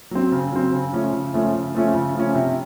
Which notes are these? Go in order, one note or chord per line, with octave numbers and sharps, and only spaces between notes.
F#3 C4
C#3
F#3 C4
C#3
F3 A3 C#4
C#3
F3 A3 C#4
C#3
F3 A3 C#4
C#3
F3 A3 C#4
C3